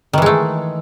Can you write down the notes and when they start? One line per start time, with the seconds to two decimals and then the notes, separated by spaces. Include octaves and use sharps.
0.13 D#3
0.18 E3
0.22 G#3
0.26 A3